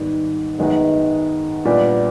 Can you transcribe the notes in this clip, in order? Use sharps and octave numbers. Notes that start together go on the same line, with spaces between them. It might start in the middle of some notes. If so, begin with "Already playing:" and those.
Already playing: G#2 D#3 G3 B3
F#2 D#3 G#3 B3 D#4
A#2 G3 B3 D4